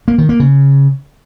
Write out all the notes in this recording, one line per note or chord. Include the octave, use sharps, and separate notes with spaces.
A#3
D#3
A#3
C#3